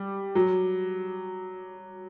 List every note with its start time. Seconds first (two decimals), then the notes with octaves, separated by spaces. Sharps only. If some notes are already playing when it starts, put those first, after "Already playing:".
Already playing: G3
0.35 F#3